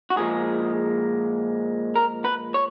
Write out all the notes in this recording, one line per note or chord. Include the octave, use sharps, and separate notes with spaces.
F#4
A#2 F3 G#3 G#4
A#4
B4
C#5